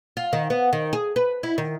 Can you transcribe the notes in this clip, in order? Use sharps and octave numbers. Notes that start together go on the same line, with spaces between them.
F4
D#3
B3
D#3
G#4
B4
E4
D#3